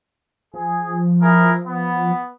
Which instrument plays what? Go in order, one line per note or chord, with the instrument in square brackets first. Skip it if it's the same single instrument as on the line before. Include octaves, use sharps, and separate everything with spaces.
[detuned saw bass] F3 [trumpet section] G#4
[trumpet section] E4 G#4 A#4
B3